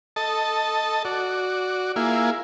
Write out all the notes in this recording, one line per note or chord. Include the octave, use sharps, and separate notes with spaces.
A4 D#5 A5
F#4 D5
A#3 E4 F4 G#4